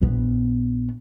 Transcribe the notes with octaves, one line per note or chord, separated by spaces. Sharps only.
A#1 B3